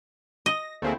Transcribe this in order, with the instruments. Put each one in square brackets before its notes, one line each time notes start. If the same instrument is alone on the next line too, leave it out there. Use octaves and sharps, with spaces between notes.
[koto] D#5 [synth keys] A#6
[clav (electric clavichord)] D2 A#3 G#4 [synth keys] A3 C4 E4